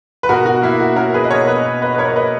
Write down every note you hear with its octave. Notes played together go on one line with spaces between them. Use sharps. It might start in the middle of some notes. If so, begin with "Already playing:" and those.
B4
B2 F#4 A#4
F#4
A#3 E4
F#4
C#4 F#4 A#4
G#4 B4
D#5
B2 A#4 C#5
B4 D#5
B2
B4 D#5
B4
A#3 A#4 C#5
C#5
B4 D#5